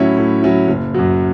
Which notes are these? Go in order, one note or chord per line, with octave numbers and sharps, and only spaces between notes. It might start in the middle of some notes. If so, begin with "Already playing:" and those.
Already playing: A2 F#3 C#4 E4
A2
F#3 C#4 E4
F#1
F#2 F#3